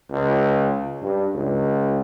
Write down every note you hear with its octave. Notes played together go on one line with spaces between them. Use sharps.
C#2
G2
C#2